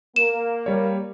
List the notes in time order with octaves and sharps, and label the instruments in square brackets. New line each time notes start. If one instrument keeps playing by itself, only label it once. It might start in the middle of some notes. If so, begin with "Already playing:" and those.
[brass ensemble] A#3 [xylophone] E7
[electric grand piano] G3 C#5